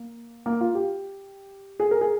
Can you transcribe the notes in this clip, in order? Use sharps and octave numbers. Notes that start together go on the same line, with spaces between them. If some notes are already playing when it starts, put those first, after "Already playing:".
Already playing: A#3
A#3
F4
G4
G#4
A#4
G#4